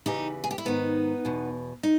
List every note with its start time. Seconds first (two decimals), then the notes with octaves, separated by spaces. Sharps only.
0.06 E2 C#3 E3 D#4 G4
0.44 G#4
0.51 G4
0.58 E4
0.65 G#2 D#3 B3 D#4
1.25 E2 B2
1.83 D#4